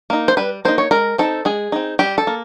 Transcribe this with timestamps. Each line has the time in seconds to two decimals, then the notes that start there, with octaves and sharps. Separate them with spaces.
0.10 A#3 D#4
0.28 C5
0.37 G3 B4
0.65 A#3 D#4 C5
0.78 C#5
0.91 G#3 A#4
1.18 C4 D#4 A4
1.45 G#3 G#4
1.72 C4 D#4
1.99 G3 G4
2.18 A4
2.27 A#3